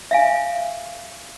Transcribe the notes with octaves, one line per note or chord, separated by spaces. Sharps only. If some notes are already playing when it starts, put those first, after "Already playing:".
E5 F5 G#5